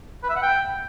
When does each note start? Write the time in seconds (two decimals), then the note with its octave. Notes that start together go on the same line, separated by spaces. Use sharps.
0.23 B4
0.29 E5
0.36 F#5
0.42 G5